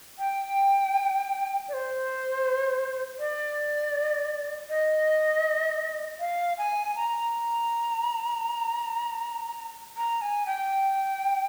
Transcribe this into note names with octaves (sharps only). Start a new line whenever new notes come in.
G5
D5
C5
D5
D#5
F5
G#5
A#5
A#5
G#5
G5